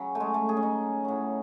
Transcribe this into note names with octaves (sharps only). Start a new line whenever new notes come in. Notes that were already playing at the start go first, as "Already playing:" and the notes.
Already playing: C#3 F#3
A3
G#3
A3
G#4
C#4
D#4
A2 F#3